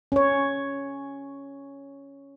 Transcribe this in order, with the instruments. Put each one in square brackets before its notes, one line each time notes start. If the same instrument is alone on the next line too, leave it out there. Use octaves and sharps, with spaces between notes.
[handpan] C#4 C#5